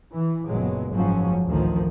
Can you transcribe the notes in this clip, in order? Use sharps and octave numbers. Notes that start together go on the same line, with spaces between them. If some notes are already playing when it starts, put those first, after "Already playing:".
E3
F#1 A#2 F#3 G#3 B3
F#1 G#2 F3 F#3 C#4
A1 D2 D#3 F3